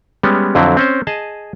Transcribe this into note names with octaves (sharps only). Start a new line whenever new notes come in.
G3 G#3 B3 C#4
F2 D3 F#3 C4 E4
C4 C#4 C5
G#4 D#5 A5